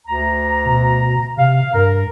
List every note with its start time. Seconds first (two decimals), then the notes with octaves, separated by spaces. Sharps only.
0.07 D2 A#5
0.66 B2
1.37 C3 F5
1.74 G2 A#4